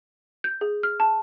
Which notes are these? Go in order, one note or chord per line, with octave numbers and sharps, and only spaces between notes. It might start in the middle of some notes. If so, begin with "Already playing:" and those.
G6
G#4
F6
A5